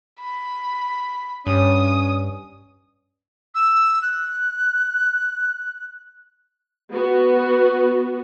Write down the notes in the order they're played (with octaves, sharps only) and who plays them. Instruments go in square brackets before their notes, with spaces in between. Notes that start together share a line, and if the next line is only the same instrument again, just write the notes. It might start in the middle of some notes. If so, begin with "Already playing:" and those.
[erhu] B5
[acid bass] G2 [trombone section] C#4 [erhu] D#6
[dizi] E6
F#6
[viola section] B3 F#4